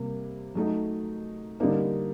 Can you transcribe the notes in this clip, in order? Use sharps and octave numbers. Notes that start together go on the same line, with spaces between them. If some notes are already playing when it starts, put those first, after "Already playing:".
Already playing: C3 G3 A#3
F#3 A3 D#4
D3 G3 A#3 D#4